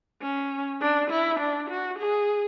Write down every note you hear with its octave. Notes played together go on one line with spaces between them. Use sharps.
C#4
D4
E4
D4
F#4
G#4